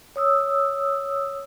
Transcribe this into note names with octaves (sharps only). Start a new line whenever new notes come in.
C#5 D#6 E6